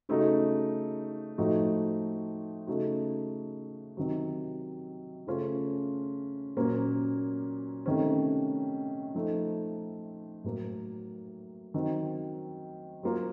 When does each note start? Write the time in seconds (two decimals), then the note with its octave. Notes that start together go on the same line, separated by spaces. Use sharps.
0.09 C#3 A3 D#4 F#4
1.38 A2 F3 A3 D#4 F#4
2.67 C#3 A3 D#4 F#4
3.97 C3 D#3 F#3
5.27 C#3 A3 C#4 F4
6.57 A#2 F#3 A#3 C#4
7.86 C3 D#3 A3 C#4
9.14 F3 A3 D#4
10.44 A2 F#3 A#3
11.74 D#3 F#3 C4 F#4
13.03 F#3 A#3 F4